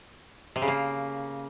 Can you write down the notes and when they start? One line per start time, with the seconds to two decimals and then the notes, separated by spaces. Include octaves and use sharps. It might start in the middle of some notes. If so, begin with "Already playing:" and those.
0.56 C3
0.62 C#3
0.68 A#3